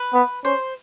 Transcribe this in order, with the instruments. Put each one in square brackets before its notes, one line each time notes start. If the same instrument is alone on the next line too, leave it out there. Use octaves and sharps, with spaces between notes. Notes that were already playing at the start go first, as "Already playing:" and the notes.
Already playing: [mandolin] B4
[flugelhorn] B3
[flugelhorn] C#4 [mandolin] C5